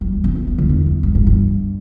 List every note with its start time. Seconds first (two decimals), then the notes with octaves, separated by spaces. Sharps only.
0.01 F#3
0.12 G3
0.24 C#4
0.35 B3
0.47 B3
0.58 D3
0.69 E2
0.86 F#2
1.03 G2
1.15 G2
1.27 G2